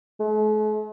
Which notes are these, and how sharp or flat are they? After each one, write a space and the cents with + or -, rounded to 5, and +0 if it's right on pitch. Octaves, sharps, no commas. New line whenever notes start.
A3 -45